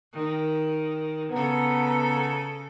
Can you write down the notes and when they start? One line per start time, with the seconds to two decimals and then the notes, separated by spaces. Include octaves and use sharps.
0.13 D#3
1.32 C#3 B3 A4 A#5